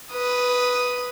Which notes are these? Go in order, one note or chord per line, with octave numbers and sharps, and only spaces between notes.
B4 D#6